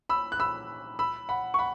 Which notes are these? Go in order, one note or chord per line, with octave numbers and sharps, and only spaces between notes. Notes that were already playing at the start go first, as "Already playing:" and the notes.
B5 E6
F#6
B5 E6
B5 E6
F#5 B5
C#6
F#5 B5